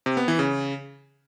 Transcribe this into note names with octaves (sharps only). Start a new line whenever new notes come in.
C3
B3
E3
C#3